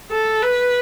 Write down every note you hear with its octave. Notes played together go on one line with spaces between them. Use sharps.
A4
B4